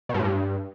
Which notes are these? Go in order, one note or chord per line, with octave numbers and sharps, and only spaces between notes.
B2
G2
A2
G2